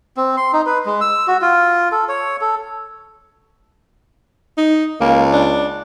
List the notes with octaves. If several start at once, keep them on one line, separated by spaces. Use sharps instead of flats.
C4
C6
D#4
B4
G#3
E6
F#4
F4
A4
C#5
A4
D#4
C#2 A#3
D4